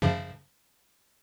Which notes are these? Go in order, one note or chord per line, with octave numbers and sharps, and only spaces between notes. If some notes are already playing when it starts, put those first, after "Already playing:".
F#2 C#3 F3